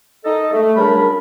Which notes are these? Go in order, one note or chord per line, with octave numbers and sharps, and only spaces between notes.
D#4 A4 D#5
A3
F#2 C#3 G3 D4 A#4 B5